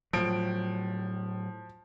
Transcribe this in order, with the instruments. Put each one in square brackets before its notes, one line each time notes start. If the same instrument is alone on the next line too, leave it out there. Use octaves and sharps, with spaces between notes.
[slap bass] A2 F#3 [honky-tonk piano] F3 D7